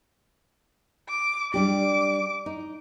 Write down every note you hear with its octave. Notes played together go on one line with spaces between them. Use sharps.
D6
G3 D4 G4 D6
D#4